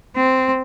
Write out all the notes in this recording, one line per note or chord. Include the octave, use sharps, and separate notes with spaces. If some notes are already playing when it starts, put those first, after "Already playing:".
C4